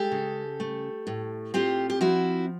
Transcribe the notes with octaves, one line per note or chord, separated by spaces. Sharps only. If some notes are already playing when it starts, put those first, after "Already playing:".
Already playing: G#3 G4 A4
C#3
A3
A2
C4 F4 G4
G4
F3 E4 F#4